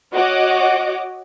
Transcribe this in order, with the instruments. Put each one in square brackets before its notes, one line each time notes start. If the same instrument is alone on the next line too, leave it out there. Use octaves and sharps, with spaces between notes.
[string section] F#4 C#5 D#5 F#5 D6